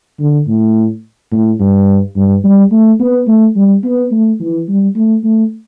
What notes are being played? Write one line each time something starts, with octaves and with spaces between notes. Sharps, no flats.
D3
A2
A2
G2
G2
G3
A3
B3
A3
G3
B3
A3
E3
G3
A3
A3